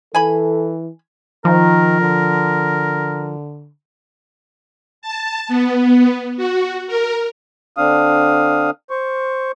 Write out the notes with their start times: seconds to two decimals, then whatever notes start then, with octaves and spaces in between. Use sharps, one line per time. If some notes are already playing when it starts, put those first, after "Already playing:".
0.15 E3 A4 G#5 B5
1.45 D#3 F3 A#4
2.01 D3
5.02 A5
5.48 B3
6.37 F#4
6.87 A#4
7.77 D3 C4 D4 F5 D#6
8.90 C5 C#6